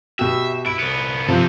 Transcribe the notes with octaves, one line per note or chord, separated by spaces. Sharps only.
B2 G4 E5
E4 D7
C2 B3
C3 F3 C4 A4